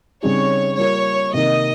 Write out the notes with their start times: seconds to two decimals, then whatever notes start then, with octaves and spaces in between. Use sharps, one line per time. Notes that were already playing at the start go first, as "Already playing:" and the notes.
0.23 C#3 G3 C4 D#4 G#4 C#5
0.78 G3 A#3 F4 A#4 C#5
1.33 C3 D#3 A#3 D#5